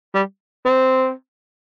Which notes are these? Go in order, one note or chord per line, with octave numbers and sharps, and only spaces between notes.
G3
C4